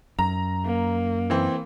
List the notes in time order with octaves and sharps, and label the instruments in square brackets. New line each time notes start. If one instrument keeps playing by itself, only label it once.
[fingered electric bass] F#2 [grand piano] A#5
[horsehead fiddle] A#3
[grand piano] E3 C4